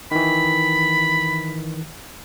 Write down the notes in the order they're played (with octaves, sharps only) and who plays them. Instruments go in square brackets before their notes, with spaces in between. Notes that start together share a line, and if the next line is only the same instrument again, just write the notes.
[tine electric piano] D#3 E3 [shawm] B5